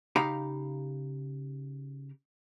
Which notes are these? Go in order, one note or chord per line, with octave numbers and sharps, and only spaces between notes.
C#3 D#4 G4 F5 A#5 B5